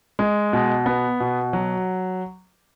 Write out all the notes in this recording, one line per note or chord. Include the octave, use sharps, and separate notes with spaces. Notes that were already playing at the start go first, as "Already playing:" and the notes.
G#3
B2
B3
B2
F#3